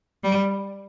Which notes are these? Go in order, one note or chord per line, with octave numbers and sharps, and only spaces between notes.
G3